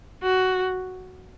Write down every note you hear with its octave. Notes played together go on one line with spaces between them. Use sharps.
F#4